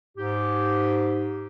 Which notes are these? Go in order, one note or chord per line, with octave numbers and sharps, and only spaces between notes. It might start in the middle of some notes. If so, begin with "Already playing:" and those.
G#2 G4